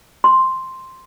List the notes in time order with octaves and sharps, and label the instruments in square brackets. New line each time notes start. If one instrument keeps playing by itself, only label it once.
[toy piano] C6